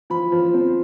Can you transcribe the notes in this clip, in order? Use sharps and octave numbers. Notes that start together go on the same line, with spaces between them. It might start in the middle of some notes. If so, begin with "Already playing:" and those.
F3 B5
F3
C4